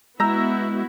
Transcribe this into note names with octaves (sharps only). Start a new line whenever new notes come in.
G#3 B3 E4 F#4 A#5 E6 G6 A#6